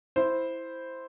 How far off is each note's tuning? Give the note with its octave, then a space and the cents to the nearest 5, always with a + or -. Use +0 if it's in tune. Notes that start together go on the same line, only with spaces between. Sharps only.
E4 +0 C5 +0